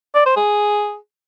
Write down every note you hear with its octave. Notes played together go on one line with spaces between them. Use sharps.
D5
C5
G#4